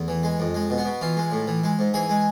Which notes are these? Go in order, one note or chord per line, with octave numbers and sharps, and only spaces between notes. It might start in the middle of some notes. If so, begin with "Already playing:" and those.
Already playing: E2 A3
E3
G#3
F2
G#3
B2
B3
B2
E3 F4
G#3
A2
E3
G#3
G#2
E3 G#4
G#3